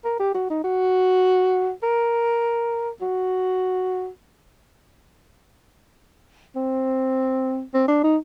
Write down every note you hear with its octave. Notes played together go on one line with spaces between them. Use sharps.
A#4
G4
F#4
D#4
F#4
A#4
F#4
C4
C4
D4
D#4